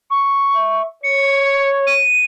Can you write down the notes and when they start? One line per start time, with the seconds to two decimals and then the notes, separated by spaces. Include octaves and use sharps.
0.11 C#6
0.56 E5
1.04 C#5 C#7
1.87 D#7